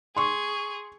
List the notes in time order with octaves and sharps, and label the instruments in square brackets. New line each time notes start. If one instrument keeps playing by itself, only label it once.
[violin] G#4 [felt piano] C6 C#6